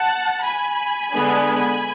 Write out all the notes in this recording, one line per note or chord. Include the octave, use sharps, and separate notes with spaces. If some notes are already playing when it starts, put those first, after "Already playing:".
Already playing: F#5 A5
G#5 B5
D3 G#3 B3 D4